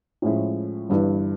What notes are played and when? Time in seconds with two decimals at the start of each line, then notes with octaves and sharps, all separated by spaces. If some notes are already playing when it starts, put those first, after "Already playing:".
0.22 A2 F3 G#3 C#4 E4
0.89 G1 G2 E3